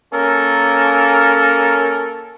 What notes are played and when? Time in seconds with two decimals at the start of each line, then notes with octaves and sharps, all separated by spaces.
0.13 A#3 C#4 A4 A#4